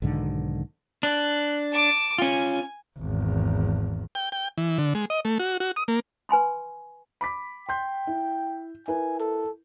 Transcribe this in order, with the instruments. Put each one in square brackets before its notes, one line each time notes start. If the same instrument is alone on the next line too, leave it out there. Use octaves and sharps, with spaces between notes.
[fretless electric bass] B1 G#2 D3 D#3
[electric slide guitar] D4 [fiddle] F#6
[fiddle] A5 D6
[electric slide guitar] C#4 F4 [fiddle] G#5
[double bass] G#1 E2
[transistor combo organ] G5
G5
E3
D3
G#3
D#5
A3
F#4
F#4
D#6
A#3
[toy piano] B4 G#5 B5 C6
[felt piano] B5 D6 B6
[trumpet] G5 [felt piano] C6 G6
[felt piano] E4
[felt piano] E4 A#4 B4 [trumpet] G#5
[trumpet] A4